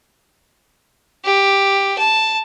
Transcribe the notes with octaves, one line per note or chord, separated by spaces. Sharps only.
G4
A5